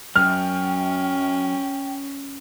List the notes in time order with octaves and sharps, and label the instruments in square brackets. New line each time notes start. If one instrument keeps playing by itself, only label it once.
[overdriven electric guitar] F#2 [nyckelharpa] C#4 [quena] G5 [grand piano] F6